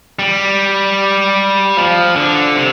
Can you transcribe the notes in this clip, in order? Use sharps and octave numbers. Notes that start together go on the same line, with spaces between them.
G3
F3
D3
C3